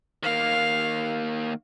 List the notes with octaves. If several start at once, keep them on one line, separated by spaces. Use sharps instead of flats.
D#3 A#3 F5